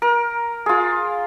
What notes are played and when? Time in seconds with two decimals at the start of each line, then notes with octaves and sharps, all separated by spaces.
0.02 A#4
0.66 F4 G#4